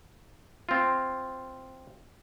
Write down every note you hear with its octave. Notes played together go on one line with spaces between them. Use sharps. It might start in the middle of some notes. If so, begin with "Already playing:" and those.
C4 F4